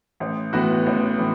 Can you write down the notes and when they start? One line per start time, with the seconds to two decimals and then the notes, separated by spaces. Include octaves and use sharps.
0.20 A1
0.53 A2 E3 B3 F#4
0.86 A1
1.18 A2 E3